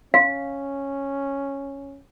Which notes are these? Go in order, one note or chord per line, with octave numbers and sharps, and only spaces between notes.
C#4 F5